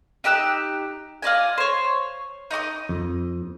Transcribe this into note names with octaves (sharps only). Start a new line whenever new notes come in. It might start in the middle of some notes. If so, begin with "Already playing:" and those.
D#4 G4 E6 F#6
F4 D5 D#5 G#5
C5 C#5
D#4 D#5 C#6 D#6
F2